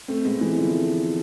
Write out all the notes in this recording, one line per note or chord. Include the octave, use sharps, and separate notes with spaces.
A3 C4
G#3 B3
E3 G#3
D3 F3